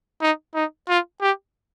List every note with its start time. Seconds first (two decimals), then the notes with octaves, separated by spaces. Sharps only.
0.21 D#4
0.55 D#4
0.89 F4
1.21 G4